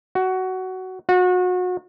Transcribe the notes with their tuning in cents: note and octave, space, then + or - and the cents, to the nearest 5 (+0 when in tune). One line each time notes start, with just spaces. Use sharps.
F#4 +15
F#4 -30